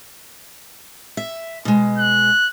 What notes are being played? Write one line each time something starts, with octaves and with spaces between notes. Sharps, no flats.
E5
B2 G#3
F#6